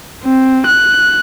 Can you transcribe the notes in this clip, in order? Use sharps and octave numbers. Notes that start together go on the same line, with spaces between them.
C4
F#6